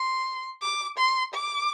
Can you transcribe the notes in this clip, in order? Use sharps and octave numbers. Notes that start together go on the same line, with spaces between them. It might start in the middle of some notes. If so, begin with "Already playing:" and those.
Already playing: C6
D6
C6
D6